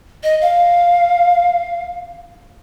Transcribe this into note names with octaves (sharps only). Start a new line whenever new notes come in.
D#5
F5